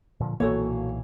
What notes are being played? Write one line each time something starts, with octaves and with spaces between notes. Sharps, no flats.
A#2 D3 F3
B1 A#2 E3 A#3 F#4 A4 C#5